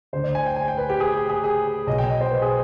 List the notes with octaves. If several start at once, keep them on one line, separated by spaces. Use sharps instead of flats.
D2 D3 C5
D5
G#5
G5
G#5
G5
B4
G4
G#4
G4
G#4
G#4
B1 B2 D#5
G5
D#5
C5
B4
G#4